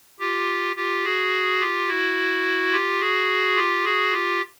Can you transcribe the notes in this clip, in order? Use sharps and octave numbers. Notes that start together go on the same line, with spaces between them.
F4 G4
F4 G4
F#4 G#4
F4 G4
E4 F#4
F4 G4
F#4 G#4
F4 G4
F#4 G#4
F4 G4